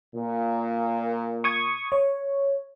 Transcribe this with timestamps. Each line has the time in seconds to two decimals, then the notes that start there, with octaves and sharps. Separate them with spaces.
0.15 A#2
1.44 C#6 D#6 G#6
1.92 C#5